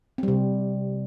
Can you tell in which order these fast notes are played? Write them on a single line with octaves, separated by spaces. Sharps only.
C4 G3 C3